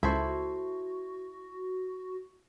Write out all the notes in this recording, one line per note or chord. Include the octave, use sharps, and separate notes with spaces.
C#2 E4 F#4 A4 C5